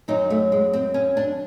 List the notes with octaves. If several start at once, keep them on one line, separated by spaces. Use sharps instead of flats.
F#2 D#3 F#3 D#4
A3
G#3
C4
C#4
D4